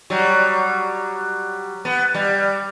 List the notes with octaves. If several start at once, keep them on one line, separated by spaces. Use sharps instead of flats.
F#3 G3
B3
G3